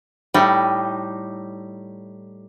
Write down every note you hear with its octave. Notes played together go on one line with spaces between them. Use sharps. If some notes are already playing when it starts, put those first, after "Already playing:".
A2 G3 D#4